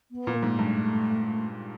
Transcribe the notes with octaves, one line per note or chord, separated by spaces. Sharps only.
B3
A#2
A#3
G#2
G2 A3